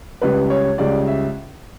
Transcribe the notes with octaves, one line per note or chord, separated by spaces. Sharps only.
C#2 C#3 G3 B4
C#5
C#2 C#3 G3 D5
E5